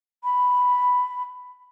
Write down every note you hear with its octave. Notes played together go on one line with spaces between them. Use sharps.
B5